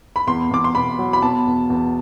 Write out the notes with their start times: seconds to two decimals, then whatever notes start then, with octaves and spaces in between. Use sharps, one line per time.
0.16 B5
0.27 E2 C6
0.51 E2 D6
0.64 C6
0.75 B2 B5
0.99 F#3
1.13 B5
1.22 B2 A5
1.47 E2
1.70 E2